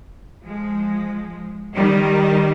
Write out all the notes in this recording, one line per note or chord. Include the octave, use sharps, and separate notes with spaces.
F3 G#3
D#3 G3